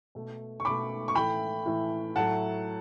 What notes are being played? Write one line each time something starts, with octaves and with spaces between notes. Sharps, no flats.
B2 A3
C#6
B2 A3 B5 D6
C#6
A2 E3 A3 G5 B5
A2 E3 A3
A2 F#3 A3 F#5 A5